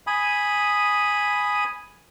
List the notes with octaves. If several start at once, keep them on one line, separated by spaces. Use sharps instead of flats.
G#5 B5 D#6